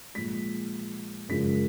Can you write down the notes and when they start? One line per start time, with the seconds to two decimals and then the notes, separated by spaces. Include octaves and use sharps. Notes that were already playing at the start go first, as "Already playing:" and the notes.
0.14 A#2 F3 G#3 B6
1.29 F#2 C#3 F3 G#3 B6